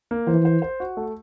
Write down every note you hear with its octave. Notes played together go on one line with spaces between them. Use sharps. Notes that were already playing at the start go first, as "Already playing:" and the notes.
A#3
E3 C5
C5
C5
F#4
A3